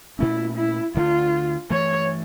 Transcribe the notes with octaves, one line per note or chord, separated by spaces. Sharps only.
A#2 A3 C#4 E4
E4
D2 D3 A3 F4
G2 E3 A3 C#5